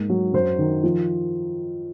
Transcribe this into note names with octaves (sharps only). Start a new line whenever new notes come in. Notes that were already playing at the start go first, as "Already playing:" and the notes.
Already playing: G#2 A#3
F#3
F#2 C5
D#3
F3